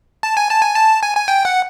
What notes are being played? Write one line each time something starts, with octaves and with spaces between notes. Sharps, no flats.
A5
G#5
A5
G#5
A5
G#5
G#5
G5
F#5